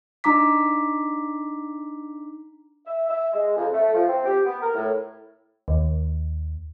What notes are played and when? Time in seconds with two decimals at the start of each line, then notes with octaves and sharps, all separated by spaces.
0.24 D4 D#4 A#5 D6 B6
2.87 E5
3.09 E5
3.33 G#3
3.56 F2
3.74 A3
3.94 F3
4.08 C4
4.26 G4
4.45 B3
4.62 A#4
4.75 A2
5.68 D#2